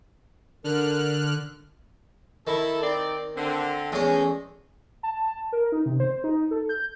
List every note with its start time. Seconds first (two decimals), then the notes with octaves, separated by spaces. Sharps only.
0.64 D3 A#4 F6 F#6
2.47 D#3 E4 A4
2.82 C4 D#4 D5
3.37 D3 C4
3.92 E2 G#3 A3 C#4
5.03 A5
5.53 A#4
5.72 D#4
5.86 C3
6.00 C5
6.24 D#4
6.51 A4
6.69 G6